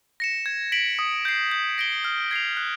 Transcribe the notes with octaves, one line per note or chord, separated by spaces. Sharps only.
A#6 C#7 E7
G#6
B6 D7 F#7
D#6
G6 C7
G6
A#6 D7 G7
F6
G#6 C7 F7
F#6